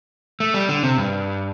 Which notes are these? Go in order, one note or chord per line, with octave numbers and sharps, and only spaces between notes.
A3
G3
D3
C3
G2